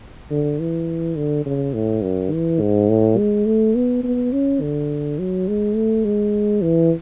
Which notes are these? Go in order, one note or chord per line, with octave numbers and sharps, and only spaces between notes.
D3
E3
D3
C#3
A2
F#2
E3
G#2
A2
G#3
A3
B3
B3
C#4
D3
F#3
G#3
A3
G#3
E3